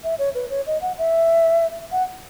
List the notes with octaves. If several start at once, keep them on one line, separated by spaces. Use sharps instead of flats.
E5
C#5
B4
C#5
D#5
F#5
E5
F#5